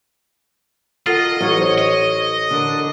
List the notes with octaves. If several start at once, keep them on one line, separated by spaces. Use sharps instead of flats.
F4 A4 A#4 D#5 F#5
A1 F#3 F4 C#5
C5
D#5
D3 D4 A#4